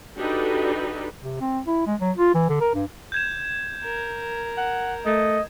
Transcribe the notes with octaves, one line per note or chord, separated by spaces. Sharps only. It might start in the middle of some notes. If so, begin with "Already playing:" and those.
D4 D#4 F#4 G4 A4 B4
C3
C4
E4
G#3
F#3
F4
E3
D3
A#4
G2
G6 G#6 E7
A#4
F#5
A3 D#5